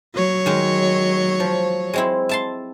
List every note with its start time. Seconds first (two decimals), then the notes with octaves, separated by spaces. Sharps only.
0.14 F#3 C#5
0.46 D#3 G#3
1.40 F3
1.94 G#3 C4 E4
2.29 E5 A5 C6